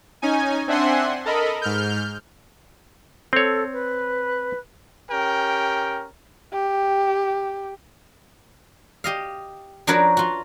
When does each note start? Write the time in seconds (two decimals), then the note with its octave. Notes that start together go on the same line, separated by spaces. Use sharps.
0.22 C#4 D#4 G#5
0.68 C4 D4 E5 F#5 G#5 C6
1.25 A4 A#4 D#5 B5
1.62 G#2 F6 G6
3.33 C4 A4 C#5
3.72 B4
5.11 C#4 G4 A#4 G5
6.53 G4
9.04 G4 D#5 F5
9.87 F3 D4 F#4 A#4 B4 C#5
10.17 F4 F#4